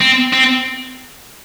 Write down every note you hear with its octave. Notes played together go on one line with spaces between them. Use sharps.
C4
C4